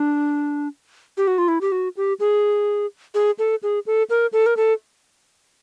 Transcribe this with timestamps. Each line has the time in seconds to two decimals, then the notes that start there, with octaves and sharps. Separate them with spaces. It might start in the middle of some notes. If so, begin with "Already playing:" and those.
Already playing: D4
1.17 G4
1.27 F#4
1.38 F4
1.48 E4
1.61 G4
1.72 F#4
1.97 G4
2.20 G#4
3.14 G#4
3.39 A4
3.63 G#4
3.86 A4
4.10 A#4
4.33 A4
4.46 A#4
4.57 A4